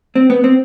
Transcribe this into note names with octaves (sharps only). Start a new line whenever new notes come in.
C4
B3
C4